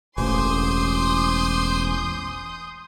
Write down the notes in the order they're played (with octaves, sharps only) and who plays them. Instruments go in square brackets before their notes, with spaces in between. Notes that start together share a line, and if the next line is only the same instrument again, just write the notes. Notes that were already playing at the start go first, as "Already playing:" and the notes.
[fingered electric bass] E1 A1 [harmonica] C5 G#5 D6 [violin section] C6 D#6 G6